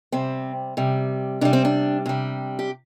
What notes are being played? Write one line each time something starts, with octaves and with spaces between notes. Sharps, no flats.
C3 G3 C4
C3 G3
C3 G3 D4
C4
D4
C3 G3
G4